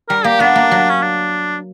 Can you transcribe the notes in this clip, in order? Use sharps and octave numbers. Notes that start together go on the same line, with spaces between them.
G3 A#4
A#3 G4
B3 D4
A#3
F#3
C#4
D4